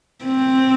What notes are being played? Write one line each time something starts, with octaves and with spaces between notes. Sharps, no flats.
C4